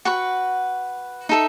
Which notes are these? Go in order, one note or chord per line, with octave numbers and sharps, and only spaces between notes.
F#4 B4 F#5 C#6
D#4 A4 E5